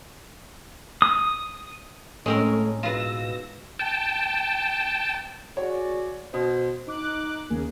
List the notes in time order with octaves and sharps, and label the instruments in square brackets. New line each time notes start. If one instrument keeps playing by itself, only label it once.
[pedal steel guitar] D#6
[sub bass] A2 [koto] G#3 C4 A#4 [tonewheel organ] A3 A4 C#5 [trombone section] C#4
[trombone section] G#2 B2 [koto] F4 B4 [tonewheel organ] E6 A#6
[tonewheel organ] G5 A5
[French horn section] F#4 G#4 D5 [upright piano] C#5
[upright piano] B2 [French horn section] C5
[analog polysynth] D#4 D6 F#6
D#2 C#3 A#3 G#4